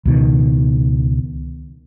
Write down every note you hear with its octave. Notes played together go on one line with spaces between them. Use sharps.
C#2 B2 D#3